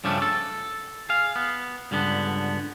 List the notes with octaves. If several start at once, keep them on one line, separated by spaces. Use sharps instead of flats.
G2 C#3 F3 G3 A3 D4
A4
G#4 F5
B3
C#2 G2 D3 B3